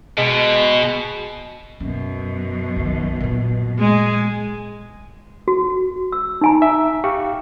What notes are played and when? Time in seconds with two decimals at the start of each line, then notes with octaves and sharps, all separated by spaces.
0.18 B2 G#3
1.80 F#2 B2 C#4
2.76 B1 D#3
3.20 A#2 B3
3.79 G#3 G#5
5.48 F#4
6.12 E6
6.41 D#4 G#5 A#5
6.62 E5
7.04 G4 F5 C#6